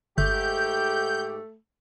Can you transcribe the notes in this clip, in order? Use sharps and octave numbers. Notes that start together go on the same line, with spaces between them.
G1 G#2 A3 G4 G6